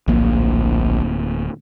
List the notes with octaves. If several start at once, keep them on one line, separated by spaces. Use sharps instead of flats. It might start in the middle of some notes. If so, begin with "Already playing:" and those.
D1 A#1 A#3